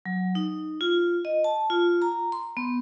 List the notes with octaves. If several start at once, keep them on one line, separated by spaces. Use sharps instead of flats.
F#3
D#4
F4
D#5
A5
F4
A#5
C6
B3